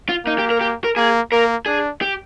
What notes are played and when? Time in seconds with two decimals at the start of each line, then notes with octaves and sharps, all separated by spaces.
0.09 F4
0.26 A#3 D#4
0.39 G4
0.50 A#4
0.61 G4
0.84 A#4
0.96 A#3 G#4
1.32 A#3 A#4
1.66 D4 G#4
2.01 G4